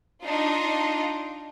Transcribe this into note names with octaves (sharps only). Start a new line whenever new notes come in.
D4 D#4 F4 D#5